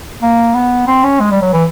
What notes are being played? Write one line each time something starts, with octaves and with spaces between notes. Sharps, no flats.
A#3
B3
C4
C#4
G#3
G3
F#3
E3